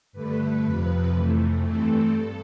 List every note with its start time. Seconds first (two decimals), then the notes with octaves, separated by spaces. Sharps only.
0.13 G2 D3 A3 B4
0.63 F2 C3 F3 B4
1.13 F2 C3 E3 A3
1.62 G2 E3 A3 C4 A4
2.12 G2